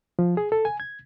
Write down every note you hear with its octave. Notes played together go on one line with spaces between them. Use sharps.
F3
G#4
A4
G#5
G#6